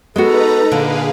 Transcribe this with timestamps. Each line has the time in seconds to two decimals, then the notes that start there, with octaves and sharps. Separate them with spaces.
0.16 G#3 B3 D#4 F#4 A4 B4 A#5
0.72 A#2 D3 G#4 B4 F5